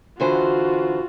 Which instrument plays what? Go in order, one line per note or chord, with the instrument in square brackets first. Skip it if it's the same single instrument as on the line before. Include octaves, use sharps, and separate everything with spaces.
[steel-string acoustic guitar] D3 E3 C5 [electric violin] F4 F#4